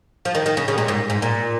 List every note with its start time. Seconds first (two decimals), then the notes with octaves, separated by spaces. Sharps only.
0.25 F3
0.35 D#3
0.46 D#3
0.57 C#3
0.68 C#3
0.78 A#2
0.88 G#2
1.10 G#2
1.22 A#2